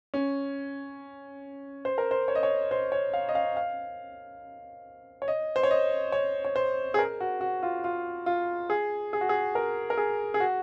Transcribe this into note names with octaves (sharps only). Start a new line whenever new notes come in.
C#4
C5
A#4
C5
C#5
D#5
C#5
C5
C#5
F5
D#5
F5
F5
C#5
D#5
C5
C#5
D#5
C#5
C#5
C5
G#4
A#4
F#4
F#4
F4
F4
F4
G#4
G#4
F#4
G#4
A#4
A#4
G#4
G#4
F#4